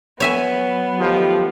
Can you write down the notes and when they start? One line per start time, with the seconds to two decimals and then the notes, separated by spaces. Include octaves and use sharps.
0.20 F#3 B3 C#5 E5 G#5
0.99 D#3 F3 A3 D#4 G4